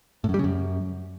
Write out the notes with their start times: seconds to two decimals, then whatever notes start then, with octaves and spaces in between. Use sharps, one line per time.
0.24 A2
0.29 F#2
0.34 G3
0.39 C#3
0.44 F#2